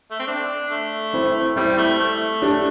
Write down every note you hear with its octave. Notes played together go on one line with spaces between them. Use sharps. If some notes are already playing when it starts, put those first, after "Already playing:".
A3
C4
D4
A3
C4 E4
G3 C4 E4
A3
A3
D4 G4